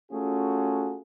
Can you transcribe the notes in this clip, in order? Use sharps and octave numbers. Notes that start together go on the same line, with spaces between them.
A3 C#4 F4 F#4 G#4